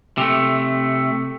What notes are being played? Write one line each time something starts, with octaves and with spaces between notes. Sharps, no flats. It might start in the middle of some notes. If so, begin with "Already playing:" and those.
C3 A3